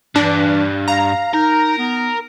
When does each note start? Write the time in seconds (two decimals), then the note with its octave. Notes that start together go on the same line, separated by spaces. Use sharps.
0.16 G2 E3 D4
0.88 F5 A#5
1.34 D#4 A#4
1.78 B3